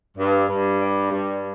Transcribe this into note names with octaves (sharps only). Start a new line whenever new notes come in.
G2
G2
G3
G2